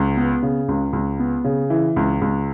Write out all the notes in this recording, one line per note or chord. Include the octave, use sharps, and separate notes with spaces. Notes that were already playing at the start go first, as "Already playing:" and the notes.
Already playing: C#2
B3
C#3
C#2
C#2
B3
C#3
E3
C#2
C#2